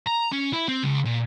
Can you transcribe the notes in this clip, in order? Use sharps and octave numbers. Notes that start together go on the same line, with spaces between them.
A#5
C#4
E4
C4
C#2
A#2